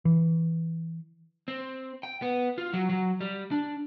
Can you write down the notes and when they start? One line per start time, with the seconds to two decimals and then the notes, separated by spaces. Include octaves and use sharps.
0.05 E3
1.48 C4
2.03 G5
2.22 B3
2.58 F4
2.73 F#3
2.89 F#3
3.21 G3
3.51 D4